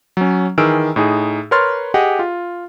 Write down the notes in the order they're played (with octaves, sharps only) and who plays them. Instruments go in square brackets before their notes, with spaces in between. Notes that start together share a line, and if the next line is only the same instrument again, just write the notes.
[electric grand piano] F#3 C#4
D#3 E3 G#4 E6 F6 D7
A2 D#4 G#4
A#4 B4 C#5 C6 F6 A6
G4 G#4 D#5 F#5
F4